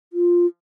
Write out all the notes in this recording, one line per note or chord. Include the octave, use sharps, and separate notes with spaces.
F4